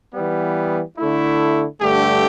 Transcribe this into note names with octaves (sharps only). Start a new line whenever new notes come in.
E3 G3 B3
D3 A3 E4
G2 D3 A3 G4